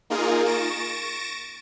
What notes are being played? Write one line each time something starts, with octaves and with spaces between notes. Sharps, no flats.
A#3 D#4 F4 G#4 A#4
C#6 A6 A#6 D7 E7